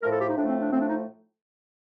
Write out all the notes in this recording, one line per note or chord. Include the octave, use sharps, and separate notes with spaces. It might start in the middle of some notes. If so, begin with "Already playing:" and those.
A2 F3 A3 A#4
A4
G4
D#4
A2 F3 A3 D4
C4
D4
A2 F3 A3 C4
D4
D#4